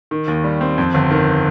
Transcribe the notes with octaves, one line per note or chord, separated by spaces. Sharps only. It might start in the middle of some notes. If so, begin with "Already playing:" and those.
D#3
D#2
G3
C4
F2
G1
D#3